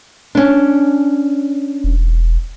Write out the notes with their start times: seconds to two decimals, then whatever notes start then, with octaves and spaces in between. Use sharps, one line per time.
0.35 C#4 D4
1.84 E1